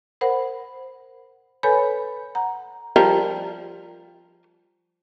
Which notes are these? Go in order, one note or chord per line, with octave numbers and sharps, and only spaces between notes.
A#4 C5 F#5 B5
A4 B4 C#5 G#5 B5 G6
F#5 A#5
F3 G3 A#4